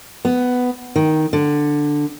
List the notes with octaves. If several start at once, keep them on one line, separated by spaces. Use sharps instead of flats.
B3
D#3
D3